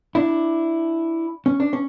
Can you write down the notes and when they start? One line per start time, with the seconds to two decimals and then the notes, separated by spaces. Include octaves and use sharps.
0.15 D4 E4
1.46 C#4
1.60 D4
1.73 C#4